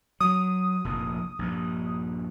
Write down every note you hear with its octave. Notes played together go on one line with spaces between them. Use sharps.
F#3 D#6
F1 A#1 A#2
A#1 G2